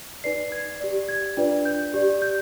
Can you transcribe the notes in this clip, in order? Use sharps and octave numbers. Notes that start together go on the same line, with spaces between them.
D#4 B4 D5 C7
G#6
G4 D5
G#6
D4 F4 B4 D5
G6
G4 D5
G6